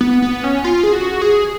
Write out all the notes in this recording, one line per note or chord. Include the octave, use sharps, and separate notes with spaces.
B3
B3
C#4
F4
G#4
F#4
G#4